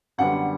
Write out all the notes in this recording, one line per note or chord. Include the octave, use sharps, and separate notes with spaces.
F#2 D3 G3 B3 F#5